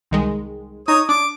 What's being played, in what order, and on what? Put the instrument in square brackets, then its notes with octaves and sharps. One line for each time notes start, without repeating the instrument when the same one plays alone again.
[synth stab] C2 D#3 G#3
[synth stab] D#4 [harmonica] C#5 D#6
[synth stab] D4 [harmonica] D6